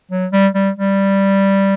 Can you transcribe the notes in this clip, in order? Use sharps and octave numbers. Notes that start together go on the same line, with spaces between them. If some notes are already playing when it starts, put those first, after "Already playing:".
F#3
G3
G3
G3